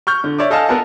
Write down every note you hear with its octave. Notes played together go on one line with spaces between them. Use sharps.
C#6 F6 G6
D3
C#5 D5 E5 D6
A4 D#5 F5 G#5 A5 F6
B3 A4 A#4 F#5 A5